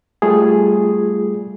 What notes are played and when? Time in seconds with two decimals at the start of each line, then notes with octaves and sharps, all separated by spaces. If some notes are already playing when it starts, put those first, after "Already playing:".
0.22 G3 A3 F4 G#4